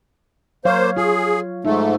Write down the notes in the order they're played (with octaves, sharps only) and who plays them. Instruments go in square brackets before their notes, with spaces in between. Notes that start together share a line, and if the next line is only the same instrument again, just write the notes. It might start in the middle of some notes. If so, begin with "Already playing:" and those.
[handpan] F#3 C#5 F5 [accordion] A#3 C5
[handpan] F4 [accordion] G#4
[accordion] G#2 A3 [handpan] D#4